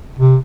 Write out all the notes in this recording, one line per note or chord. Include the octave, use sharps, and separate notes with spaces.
C3